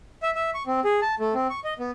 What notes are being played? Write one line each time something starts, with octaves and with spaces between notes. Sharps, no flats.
E5
E5
C#6
C4
G#4
A5
A3
C4
C#6
D#5
B3